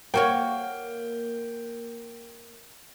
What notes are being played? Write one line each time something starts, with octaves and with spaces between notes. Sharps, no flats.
A#3 F#4 C#5 G5